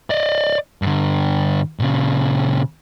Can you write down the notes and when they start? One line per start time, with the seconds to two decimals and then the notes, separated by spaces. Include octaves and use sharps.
0.10 D5 D#5
0.82 G2 D3
1.80 A#2 C#3